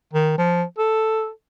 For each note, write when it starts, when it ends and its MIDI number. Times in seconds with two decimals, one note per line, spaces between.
0.14 0.34 51
0.38 0.63 53
0.78 1.29 69